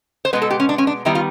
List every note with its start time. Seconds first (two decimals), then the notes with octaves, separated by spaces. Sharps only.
0.25 C5
0.33 B2 G#3 B3 B4
0.42 A4
0.51 G4
0.60 C#4
0.69 D4
0.78 C#4
0.87 D4
1.05 D#3 G3 B3 E4
1.15 F4